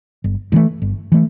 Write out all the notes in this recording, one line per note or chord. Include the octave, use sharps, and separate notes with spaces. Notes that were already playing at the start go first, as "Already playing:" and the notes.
G1
G2 E3 A3
G1
E3 A3